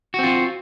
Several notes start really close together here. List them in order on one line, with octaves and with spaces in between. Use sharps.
F#4 C4 F4